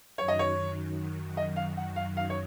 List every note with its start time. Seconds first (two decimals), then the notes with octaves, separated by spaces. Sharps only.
0.18 F#2 D#3 F#3 C#5
0.28 D#5
0.39 C#5
1.37 D#5
1.56 F5
1.77 F#5
1.96 F5
2.17 F5
2.30 C#5